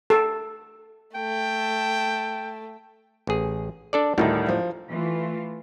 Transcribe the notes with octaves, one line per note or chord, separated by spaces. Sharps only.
A4
A3 G5
A1 G#4
D4 A4 D5
D2 A2 D#3 G3 D#4 E4
F3
E3 A3 F4